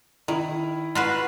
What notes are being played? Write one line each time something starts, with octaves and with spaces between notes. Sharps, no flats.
D#3 E4
F4 F#4 B4